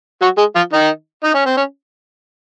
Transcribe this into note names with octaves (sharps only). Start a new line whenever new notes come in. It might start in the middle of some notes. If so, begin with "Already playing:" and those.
F#3 F#4
G#3 G#4
F3 F4
D#3 D#4
D#4
C#4
C4
C#4